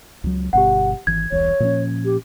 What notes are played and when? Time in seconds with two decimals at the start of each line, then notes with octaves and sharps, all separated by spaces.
0.24 C#2 F#3
0.53 G1 B2 G4 F#5
1.07 G#1 E3 G#6
1.32 E1 C2 E3 C#5
1.60 A#2 F3 C#4
2.05 G4